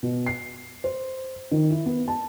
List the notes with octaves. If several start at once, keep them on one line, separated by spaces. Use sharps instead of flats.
B2
C7
C5
D#3
E4
B3
A5